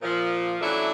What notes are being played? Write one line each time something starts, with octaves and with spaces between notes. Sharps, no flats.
A#2 F3
E3 F#3 A3 C#4 D4 E4